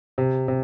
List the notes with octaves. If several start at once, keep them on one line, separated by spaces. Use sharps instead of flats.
C3
C3